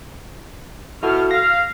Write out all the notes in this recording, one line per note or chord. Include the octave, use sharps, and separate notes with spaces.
B2 E4 F#4 A4 F6
F5 A#6